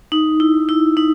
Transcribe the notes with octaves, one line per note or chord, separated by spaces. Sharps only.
D#4
E4
E4
D#4